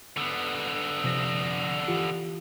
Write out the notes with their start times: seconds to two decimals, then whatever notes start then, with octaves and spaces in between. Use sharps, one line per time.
0.17 D3 B3
1.04 C3 F3 A#6
1.88 E3 F4 G4